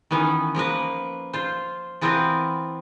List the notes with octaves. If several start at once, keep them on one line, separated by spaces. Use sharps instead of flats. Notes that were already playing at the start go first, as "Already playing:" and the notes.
D#3 E3 B3 C#4
F3 A#3 A#4 B4
F4 C5
E3 B3 C4 F4 A#4 B4